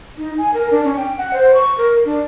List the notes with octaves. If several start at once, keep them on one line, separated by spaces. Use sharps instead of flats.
D#4
G#5
A#4
D4
C#4
G5
F#5
C5
C#6
A#4
D4